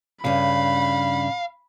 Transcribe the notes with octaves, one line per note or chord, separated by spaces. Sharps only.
G2 C#3 F5 B5